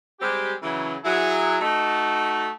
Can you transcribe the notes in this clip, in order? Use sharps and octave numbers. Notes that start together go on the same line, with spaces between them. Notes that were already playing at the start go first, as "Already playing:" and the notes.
G3 G#3 C4 G4
C#3 E3 F#3
F#3 E4 G#4
A3 D#4 F#4